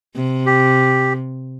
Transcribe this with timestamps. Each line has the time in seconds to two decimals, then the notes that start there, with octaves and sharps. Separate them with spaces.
0.16 C3
0.46 G4